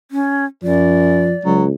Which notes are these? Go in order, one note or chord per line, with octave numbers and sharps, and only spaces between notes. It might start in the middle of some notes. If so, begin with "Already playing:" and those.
C#4
F#2 F3 D5
C#2 F#3